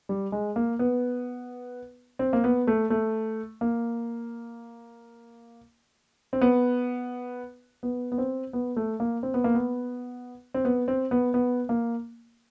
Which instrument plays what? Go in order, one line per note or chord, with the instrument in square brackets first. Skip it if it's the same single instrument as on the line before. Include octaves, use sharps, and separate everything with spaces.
[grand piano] G3
G#3
A#3
B3
C4
A#3
B3
A3
A3
A#3
C4
B3
B3
B3
C4
B3
A3
A#3
C4
B3
A#3
B3
C4
B3
C4
B3
B3
A#3